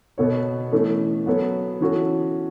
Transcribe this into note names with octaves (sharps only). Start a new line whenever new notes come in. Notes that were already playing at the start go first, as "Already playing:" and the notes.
B2 B3 A4 C#5
E3 A3 C#4 A4
F#3 B3 A4 C#5
E3 C#4 F#4 A4